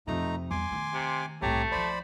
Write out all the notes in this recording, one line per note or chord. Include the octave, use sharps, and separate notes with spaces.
F2 C3 A3 D#4 A#5
E2 G3 G#5 C6 D6
D#3 A3
C3
C2 A2 A3 G4 C#5 A#5
G2 F3 C5 D5 B5